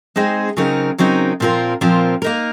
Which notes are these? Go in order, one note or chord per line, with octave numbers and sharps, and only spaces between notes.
G#3 C4 D#4 G#4 C5
C#3 F#3 C4 D#4 A#4
C#3 F#3 C4 D#4 A#4
A#2 F3 C4 F4 A#4
A#2 F3 C4 F4 A#4
A#3 D#4 A#4